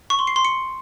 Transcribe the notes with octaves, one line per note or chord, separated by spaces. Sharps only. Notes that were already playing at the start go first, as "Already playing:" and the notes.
C#6
C6
C7
C6
C#7